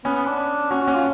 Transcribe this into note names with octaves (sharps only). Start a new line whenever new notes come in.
B3 C#4
B3
D4
C#4 F#4
F#4
C#4
F4